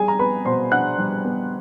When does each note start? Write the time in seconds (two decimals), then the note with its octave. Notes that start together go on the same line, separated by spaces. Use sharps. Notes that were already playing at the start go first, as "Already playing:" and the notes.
Already playing: G3 G#4 G#5
0.08 A#5
0.19 B3 B4 B5
0.45 B2 C5 C6
0.72 D4 F#5 F#6
0.99 G3
1.25 B3